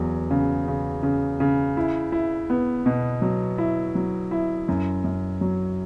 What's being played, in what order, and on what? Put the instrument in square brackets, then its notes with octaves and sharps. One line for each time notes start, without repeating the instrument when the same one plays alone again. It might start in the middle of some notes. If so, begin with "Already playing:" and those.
Already playing: [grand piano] E2 F#3
C#3
C#3
C#3
C#3
E4
E4
B3
B2
F#3
E4
F#3
E4
F#2
F#2
F#3